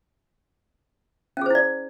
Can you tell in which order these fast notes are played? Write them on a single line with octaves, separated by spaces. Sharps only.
C#4 G#4 C5 E4 D5